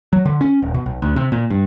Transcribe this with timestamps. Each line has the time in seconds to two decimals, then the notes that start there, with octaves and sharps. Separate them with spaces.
0.13 F#3
0.25 D3
0.41 C#4
0.62 D#1
0.74 B2
0.86 B1
1.02 D2
1.16 C3
1.32 A#2
1.50 G2